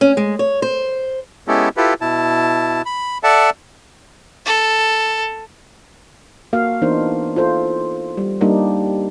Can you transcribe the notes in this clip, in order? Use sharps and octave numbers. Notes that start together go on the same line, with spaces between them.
C#4
G#3
C#5
C5
G#3 B3 C#4 E4 G4 A4
E4 F4 G4 A4 B4
B2 E4 A5
B5
A4 D5 E5 F#5 A5
A4
A#3 F#4 F5
E3 B3 D4 D#4 A#4 C5
F4 A4 C5
G3
G3 A#3 D4 D#4 G4